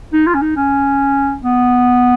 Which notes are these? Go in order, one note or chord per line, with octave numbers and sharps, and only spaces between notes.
D#4
F4
C#4
D#4
C#4
B3